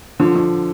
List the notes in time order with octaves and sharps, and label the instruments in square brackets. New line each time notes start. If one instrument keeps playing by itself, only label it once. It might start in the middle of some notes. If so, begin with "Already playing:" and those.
[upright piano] D3 [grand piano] F3
[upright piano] D3